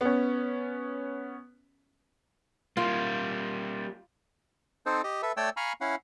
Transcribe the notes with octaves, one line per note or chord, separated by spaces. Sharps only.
B3 C#4
G3 A#3 F4
C4 D#4 A4 C5
G4 D#5
A4 B4 E5
A3 C#5 D5 G5 E6
F5 G#5 A#5 B5 C#6 F6
C#4 E4 F5 F#5